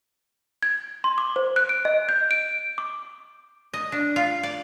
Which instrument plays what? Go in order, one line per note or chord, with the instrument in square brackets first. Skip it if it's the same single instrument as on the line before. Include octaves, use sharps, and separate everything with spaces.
[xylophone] G#6
C6
D6
C5
F#6
D7
D#5
G6
D7
D6
[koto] D#5
D4
F4
D5